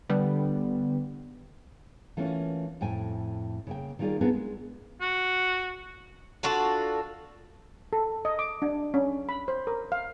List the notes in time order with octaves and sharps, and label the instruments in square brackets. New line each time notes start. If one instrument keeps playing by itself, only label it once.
[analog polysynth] D3 G3 B3
[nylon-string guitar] E3 A3 A#3 C#4 F4
F2 A2 G5 G#5
C#3 A#3 G5
D#3 G3 A#3 F4 G#4 D5
B3 C4 D4 F4 G#4 A#4
G#3
[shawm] F#4
[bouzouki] D4 F4 F#4 A4
[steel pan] A4
D#5
D6
D4
C#4
B5
C5
A#4
F5